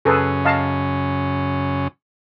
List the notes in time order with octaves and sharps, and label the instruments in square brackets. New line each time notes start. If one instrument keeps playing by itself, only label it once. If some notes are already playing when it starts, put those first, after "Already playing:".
[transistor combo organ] F#2 C#3 C#4 [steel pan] G#4 A4 B4
[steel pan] D#5 F5 A5